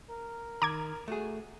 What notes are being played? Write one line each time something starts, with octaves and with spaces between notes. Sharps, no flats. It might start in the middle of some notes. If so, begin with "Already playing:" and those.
A#4
D#3 A#5 D6 G#6
A3 F#4 G#4